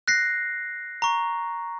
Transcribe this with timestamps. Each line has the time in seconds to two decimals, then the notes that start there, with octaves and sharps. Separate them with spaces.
0.08 F#6 A#6 C7
1.02 A#5 C#6